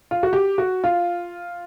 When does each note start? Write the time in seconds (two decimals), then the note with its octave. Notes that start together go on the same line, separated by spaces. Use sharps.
0.11 F4
0.23 F#4
0.33 G4
0.58 F#4
0.84 F4